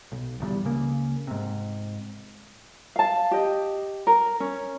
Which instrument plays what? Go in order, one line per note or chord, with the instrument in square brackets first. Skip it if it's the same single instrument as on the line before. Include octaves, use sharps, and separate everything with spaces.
[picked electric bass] B1
D1 E2 F#3 G3
C#2 C#3 A#3
G#2 C3
[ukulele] F5 A5
G4 D#5
A#4
C#4